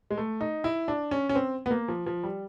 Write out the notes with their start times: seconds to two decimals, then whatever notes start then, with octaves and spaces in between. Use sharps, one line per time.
0.10 G#3
0.17 A3
0.41 D#4
0.64 E4
0.88 D4
1.11 C#4
1.29 C#4
1.35 C4
1.66 B3
1.71 A#3
1.88 F3
2.06 F3
2.23 G3